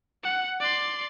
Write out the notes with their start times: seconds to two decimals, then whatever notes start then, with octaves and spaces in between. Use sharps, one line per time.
0.23 F#5
0.60 D5 C6